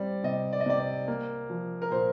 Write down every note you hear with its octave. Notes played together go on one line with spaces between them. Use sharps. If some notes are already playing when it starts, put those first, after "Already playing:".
Already playing: G3 C4 D5
C3 D#5
D5
D#5
C3 D5
D5
A#3
F3
A#4
A#2 C5